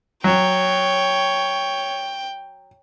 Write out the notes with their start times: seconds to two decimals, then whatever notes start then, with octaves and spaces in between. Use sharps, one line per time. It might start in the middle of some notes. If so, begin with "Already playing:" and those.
0.24 F#3 C#5 G5